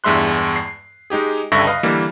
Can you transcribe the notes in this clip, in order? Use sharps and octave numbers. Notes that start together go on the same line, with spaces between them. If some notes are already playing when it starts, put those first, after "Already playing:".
E2 G2 G#3 E5 C6 F#6
C7
G#3 D#4 G4 G#4
C#2 G2 D3 E5 C#6 A#6
B4 D#5 F5
D3 E3 G3 A#3